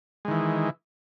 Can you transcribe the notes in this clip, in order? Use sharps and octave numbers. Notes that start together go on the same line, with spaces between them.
D#3 E3 G#3